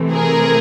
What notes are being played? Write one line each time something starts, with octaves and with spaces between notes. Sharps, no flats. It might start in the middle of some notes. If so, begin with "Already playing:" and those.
Already playing: C3 E3 A3
G#4 A#4